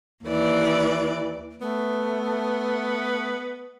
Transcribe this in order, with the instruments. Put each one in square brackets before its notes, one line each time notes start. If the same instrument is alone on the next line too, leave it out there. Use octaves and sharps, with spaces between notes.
[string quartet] D#2 E3 D5
[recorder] A3 [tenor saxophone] B3